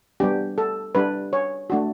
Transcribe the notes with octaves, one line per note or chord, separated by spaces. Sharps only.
G3 B3 D4 G4
A4
G3 D4 G4 B4
C#5
A3 D4 F#4